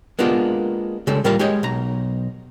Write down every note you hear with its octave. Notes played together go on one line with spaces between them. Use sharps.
G#3 A#3 B3 D4 F4 G4
C#3 G3 G#3 A4
A2 G3 A#3 F4 A#4 F5
G#3 G4 C#5 D#5
B1 A#5